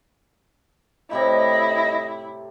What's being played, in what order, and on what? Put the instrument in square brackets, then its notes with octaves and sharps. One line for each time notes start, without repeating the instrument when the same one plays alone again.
[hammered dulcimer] A2 C3 G3 [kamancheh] E4 [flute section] D#5